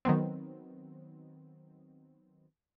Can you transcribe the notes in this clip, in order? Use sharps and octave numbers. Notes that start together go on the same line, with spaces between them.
D#3 F#3 B3 C4